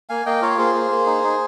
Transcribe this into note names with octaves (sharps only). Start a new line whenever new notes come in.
A#3 F5 G#5
A#3 D#5 G5
F4 A#4 C#5
A#3 G#4 C5
A#3
A#3
D#4
D#4